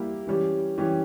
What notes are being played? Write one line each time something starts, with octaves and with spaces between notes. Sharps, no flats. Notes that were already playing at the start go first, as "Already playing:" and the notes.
Already playing: G3 A#3 E4 G4
E3 G3 C#4 G4
E3 G3 C#4 G4